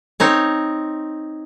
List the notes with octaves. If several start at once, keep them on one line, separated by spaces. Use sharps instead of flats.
C4 D#4 C#5